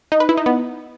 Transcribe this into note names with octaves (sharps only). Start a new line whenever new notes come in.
D#4
B4
E4
D#4
B3